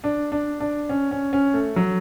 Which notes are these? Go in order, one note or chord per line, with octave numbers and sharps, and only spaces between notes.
D4
D4
D4
C#4
C#4
C#4
A3
F#3